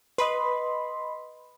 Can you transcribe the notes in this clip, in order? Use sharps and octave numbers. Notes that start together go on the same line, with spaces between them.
B4 D#5 B5 C6